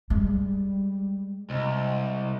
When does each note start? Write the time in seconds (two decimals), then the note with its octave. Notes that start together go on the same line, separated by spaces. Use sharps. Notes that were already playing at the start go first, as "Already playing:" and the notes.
0.10 G3 G#3
1.50 C2 D#5